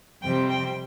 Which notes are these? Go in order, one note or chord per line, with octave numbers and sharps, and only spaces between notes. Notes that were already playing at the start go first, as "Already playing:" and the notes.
F2 C3 G3 C4 G5
G5